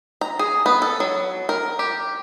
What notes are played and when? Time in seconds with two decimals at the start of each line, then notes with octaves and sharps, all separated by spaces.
0.21 A#5
0.39 G#4
0.66 B3
0.82 A4
1.00 F#3
1.49 A#4
1.79 G4